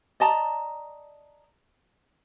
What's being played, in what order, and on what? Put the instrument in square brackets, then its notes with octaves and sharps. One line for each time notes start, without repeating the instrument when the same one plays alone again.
[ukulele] D5 D#5 A5 A#5